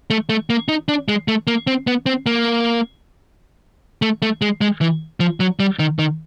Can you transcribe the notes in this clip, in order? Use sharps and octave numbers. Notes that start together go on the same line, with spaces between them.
A3
A3
A#3
D#4
D4
G#3
A3
A#3
C4
B3
C4
A#3
A3
A3
G#3
G#3
E3
F3
F#3
G3
D#3
D#3